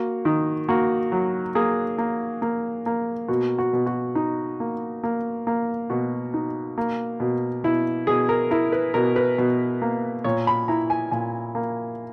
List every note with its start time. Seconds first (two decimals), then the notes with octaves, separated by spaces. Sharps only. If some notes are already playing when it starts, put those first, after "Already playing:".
Already playing: A#3 F#4
0.25 D#3
0.69 A#3 F#4
1.12 F#3
1.55 A#3 G#4
1.98 A#3
2.42 A#3
2.86 A#3
3.28 B2 F#4
3.58 F#4
3.73 B2
3.86 F#4
4.15 D#4
4.60 A#3
5.03 A#3
5.47 A#3
5.90 B2 F#4
6.34 D#4
6.78 A#3
7.20 B2
7.64 B2 E4
8.07 B2 G#4
8.29 A#4
8.51 E4 A#4
8.72 B4
8.94 B2 A#4
9.16 B4
9.38 B2
9.82 A#3
10.24 A#2 C#5
10.47 B5
10.68 E4 A#5
10.90 G#5
11.11 A#2 G#5
11.55 A#3